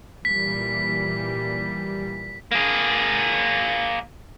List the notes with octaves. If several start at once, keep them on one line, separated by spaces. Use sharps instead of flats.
A#2 E3 G3 B6
A#3 G#4